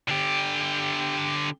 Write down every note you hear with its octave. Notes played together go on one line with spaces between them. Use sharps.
D3 G4